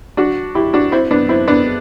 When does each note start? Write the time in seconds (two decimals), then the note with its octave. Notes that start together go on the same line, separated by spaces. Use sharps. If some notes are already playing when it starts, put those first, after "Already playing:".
0.17 D4 F#4
0.55 E4 G4
0.73 D4 F#4
0.92 C4 E4
1.11 B3 D4
1.29 C4 E4
1.47 B3 D4